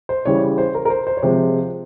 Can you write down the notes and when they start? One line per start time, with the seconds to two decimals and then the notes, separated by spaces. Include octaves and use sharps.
0.09 C5
0.26 C#3 E3 G3 C#5
0.58 C5
0.75 A#4
0.85 A#4
0.90 C5
1.07 C5
1.17 C#5
1.22 C3 F3 G#3 C5